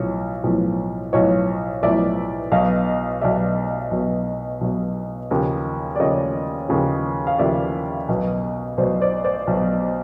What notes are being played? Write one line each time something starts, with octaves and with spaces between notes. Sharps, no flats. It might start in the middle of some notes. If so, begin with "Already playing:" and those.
Already playing: B1 A2 F3 C#5
B1 A2 F3
B1 A2 F3 C#5 D#5
B1 A2 F3 D5 E5
B1 B2 D#5 F5
B1 B2 D5 E5
B1 B2
B1 B2
D#2 C#3 F3
D5
D#2 C#3 F3 C#5 D#5
D#2 C#3 F3
F5
D#2 C#3 F3 D5 E5
B1 B2
B1 B2 C5 D5
C5 D5
C5 D5
B1 B2